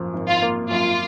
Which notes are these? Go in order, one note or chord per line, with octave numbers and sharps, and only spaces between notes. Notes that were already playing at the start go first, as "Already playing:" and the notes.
Already playing: F#2 F3 A#3
G#1
F4
A#3
F#2 F4